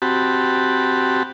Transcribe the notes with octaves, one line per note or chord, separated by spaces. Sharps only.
C4 F#4 G4 A5 B5